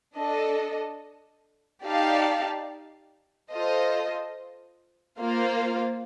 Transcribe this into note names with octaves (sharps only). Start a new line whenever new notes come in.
D4 A4 D#5
D#4 G4 D5 F5 A5
F4 A4 C5 D#5
A#3 F4 C5 F5